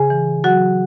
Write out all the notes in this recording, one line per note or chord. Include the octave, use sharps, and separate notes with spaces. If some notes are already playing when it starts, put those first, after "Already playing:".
Already playing: C#3 G#4 G#5
E3
F#3 F#4 F#5